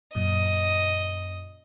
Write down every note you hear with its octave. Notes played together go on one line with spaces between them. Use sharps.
F#2 A#2 D#5 D#6